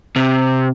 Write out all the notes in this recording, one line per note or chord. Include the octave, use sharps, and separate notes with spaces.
C3